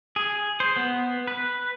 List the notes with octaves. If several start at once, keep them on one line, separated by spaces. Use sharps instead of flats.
G#4
C5
B3
B4